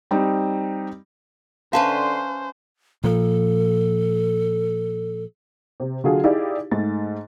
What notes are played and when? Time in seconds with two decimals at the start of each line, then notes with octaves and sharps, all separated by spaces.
0.11 G3 C4 D#4
1.73 D3 C#4 B4 C5 E5 F5 A5 C6
3.04 A#2 F3 A4
5.80 C3
6.04 D3 F#3 F4 F#4 G#4 A4
6.24 D#4 E4 G4 G#4 D5 F5
6.71 G#2 A3 A6